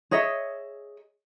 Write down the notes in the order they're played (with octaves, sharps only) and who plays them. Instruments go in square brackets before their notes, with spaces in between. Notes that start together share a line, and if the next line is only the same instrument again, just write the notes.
[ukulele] G#4 C#5 D#5 E5